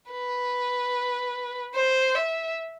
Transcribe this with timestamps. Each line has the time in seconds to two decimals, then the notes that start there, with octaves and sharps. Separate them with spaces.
0.12 B4
1.75 C5
2.15 E5